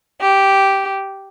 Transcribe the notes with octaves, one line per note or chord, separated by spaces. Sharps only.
G4